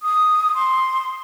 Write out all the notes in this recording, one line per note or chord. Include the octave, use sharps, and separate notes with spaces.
D#6
C6